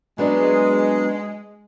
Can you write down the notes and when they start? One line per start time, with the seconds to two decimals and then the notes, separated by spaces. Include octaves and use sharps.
0.18 F#3 G#3 B3 D4